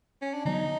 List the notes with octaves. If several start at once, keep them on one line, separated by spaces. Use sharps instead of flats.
C#4
D4
D3 F#3 B3 D#4